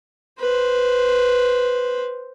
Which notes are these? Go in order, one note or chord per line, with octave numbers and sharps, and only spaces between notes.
B4 C5